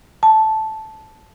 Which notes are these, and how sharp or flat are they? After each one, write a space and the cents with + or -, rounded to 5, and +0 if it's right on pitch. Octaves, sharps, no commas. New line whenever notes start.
A5 -10